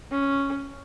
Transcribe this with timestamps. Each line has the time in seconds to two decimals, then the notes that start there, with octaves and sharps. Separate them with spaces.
0.12 C#4